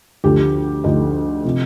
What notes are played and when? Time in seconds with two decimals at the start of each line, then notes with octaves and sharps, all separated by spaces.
0.24 D2 D3 F3 G4
0.84 D2 D3 F3 D#4
1.45 C3 F3